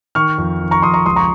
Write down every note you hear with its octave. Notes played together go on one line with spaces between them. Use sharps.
D#3 C#6 F6
F2
D#3
A#5 C#6
F2 C6 D#6
A#5 C#6
C#2 C6 D#6
A#5 C#6